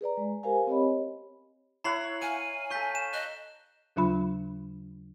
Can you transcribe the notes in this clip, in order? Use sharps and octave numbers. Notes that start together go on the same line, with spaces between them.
G#4 B4 D5 A#5
G#3
G4 A#4 C5 F5 G#5
C4 G4 C#5 D#5 B5
E4 C#5 F#5 A#5 C7 F#7
F5 G#5 D#7
A4 F5 C#6 G6 B6
E7
D#5 F#6
D#2 C#3 F#3 D4 F4 B5